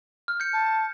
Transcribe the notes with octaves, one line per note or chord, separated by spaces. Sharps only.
F6
G6 C#7
A5